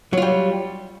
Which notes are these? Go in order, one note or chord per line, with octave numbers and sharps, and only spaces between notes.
F#3 G3 F4